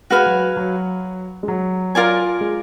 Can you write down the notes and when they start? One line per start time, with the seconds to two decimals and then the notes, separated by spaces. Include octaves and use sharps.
0.10 G#3 F#4 B4 F5 G#5
0.26 F#3
0.57 F#3
1.43 G#3
1.48 F#3
1.95 F4 A#4 D5 G#5
2.41 G#3